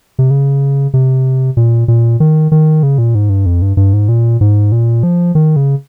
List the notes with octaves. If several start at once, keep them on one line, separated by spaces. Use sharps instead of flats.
C3
C#3
C3
A#2
A#2
D#3
D#3
C#3
A#2
G#2
G2
F2
G2
G2
G#2
A#2
G#2
A#2
F3
D#3
C#3